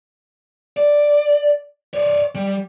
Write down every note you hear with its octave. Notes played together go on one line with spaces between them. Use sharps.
D5
C#5 D5
G3